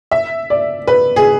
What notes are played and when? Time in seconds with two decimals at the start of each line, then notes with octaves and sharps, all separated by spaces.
0.11 E5
0.50 D5
0.87 B4
1.16 G#4